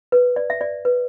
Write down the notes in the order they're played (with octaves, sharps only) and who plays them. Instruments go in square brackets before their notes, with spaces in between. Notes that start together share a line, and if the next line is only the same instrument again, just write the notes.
[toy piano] B4
D5
E5
D5
B4